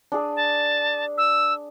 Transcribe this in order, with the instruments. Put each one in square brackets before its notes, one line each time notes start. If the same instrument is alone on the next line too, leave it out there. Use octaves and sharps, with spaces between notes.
[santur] D4 G#4
[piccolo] A5
E6